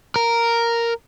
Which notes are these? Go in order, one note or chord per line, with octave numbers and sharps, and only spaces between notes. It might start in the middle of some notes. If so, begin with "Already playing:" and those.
A#4